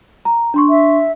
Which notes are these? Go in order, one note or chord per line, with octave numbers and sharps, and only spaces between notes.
A#5
D4 C6 C#6
E5